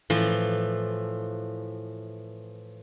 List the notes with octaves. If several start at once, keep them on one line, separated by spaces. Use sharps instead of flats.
A2 E3 F3